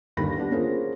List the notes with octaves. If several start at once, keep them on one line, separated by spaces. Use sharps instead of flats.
G1 D#2 D#3 B5 A#6
B3 D4 G4
A#3 C#4 F4 G#4 A#4 C5